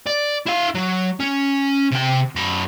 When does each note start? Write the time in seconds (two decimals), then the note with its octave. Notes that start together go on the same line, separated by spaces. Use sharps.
0.06 D5
0.47 E4 F5
0.75 F#3
1.20 C#4
1.92 C3 G5
2.36 F#2 B5